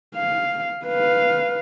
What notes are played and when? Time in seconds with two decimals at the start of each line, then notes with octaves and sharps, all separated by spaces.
0.16 F5
0.85 B4 F5